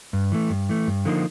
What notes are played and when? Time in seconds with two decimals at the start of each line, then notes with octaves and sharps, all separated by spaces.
0.13 G2
0.32 E3 A3
0.50 G2
0.69 E3 A3
0.87 G2
1.05 D3 F3 A#3 D#4